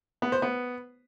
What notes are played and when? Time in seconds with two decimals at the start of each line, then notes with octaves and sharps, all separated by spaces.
0.22 B3
0.32 C5
0.42 B3